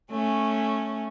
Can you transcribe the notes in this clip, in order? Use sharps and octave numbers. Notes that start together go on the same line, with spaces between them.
A3 C#4